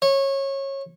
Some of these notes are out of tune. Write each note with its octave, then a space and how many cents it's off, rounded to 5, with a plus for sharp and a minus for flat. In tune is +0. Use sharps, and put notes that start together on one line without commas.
C#5 -20